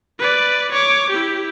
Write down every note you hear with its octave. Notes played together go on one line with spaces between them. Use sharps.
B4 D5
C#5 D6
E4 G4